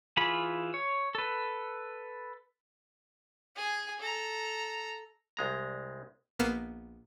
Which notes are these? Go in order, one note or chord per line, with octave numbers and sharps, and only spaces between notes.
E3 F4 G#4 B5
C#5
A4 B4
G#4 G#5
A4 A#5
C2 G#3 A#5
A#1 A#3 B3 F6 C7 E7